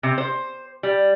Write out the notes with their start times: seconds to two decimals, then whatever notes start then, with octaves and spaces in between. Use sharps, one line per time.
0.03 C3
0.18 C5
0.83 G3